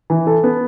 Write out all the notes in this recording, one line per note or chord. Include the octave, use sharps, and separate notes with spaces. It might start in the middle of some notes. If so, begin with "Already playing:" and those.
E3
A4
B3